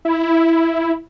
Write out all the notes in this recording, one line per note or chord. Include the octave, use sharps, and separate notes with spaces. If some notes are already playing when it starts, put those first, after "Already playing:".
E4